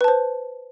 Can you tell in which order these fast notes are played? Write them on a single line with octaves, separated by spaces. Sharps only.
B4 A5 C5